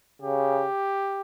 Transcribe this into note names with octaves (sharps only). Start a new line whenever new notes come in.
C#3 G4